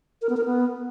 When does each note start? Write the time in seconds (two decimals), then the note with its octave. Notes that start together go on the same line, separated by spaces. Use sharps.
0.22 A#4
0.29 B3
0.37 A#4
0.45 B3